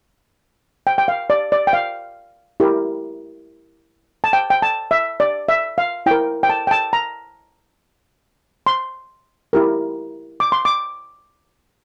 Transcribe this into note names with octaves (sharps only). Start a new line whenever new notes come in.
G5
G5
F5
D5
D5
G5
F5
E4 G4 A#4
A5
G5
G5
A5
E5
D5
E5
F5
E4 A#4 G5
G5
A5
G5
A5
A#5
C6
E4 G4 A#4
D6
C6
D6